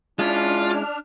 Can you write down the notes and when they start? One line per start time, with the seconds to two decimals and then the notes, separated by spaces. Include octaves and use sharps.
0.19 G#3 C#4 D4 E4 F4 F6